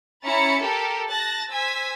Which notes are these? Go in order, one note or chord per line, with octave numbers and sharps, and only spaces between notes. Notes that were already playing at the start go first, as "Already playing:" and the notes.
C#4 E4 A#5 B5 A6 C#7
G4 A4 A#4
A5 F#6 A6 A#6
C5 G#5 E6 B6